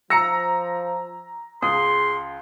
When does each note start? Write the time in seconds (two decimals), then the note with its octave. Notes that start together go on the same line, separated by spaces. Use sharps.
0.10 F3 A#5 E6 A#6 C#7
1.62 C#2 G#4 C6 D#6